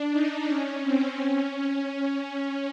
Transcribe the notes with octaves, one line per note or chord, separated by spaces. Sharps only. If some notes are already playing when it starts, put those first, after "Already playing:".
Already playing: D4
D#4
C#4
C4
C#4